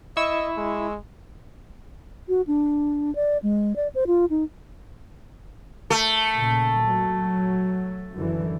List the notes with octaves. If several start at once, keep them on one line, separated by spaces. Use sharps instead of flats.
E4 D#5 C#6 E6
G#3
F#4
D4
D5
G#3
D5
C5
F4
D#4
A3
A#2 C#3
F#3
F#2 D3 E3